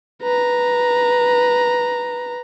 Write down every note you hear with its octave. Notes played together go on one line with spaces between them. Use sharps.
B4 A#5